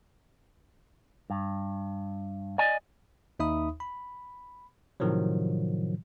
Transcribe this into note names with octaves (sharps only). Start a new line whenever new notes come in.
G2
D5 D#5 G#5
D#2 D#4 E5 B5 D#6
B5
A2 C3 D#3 F3 F#3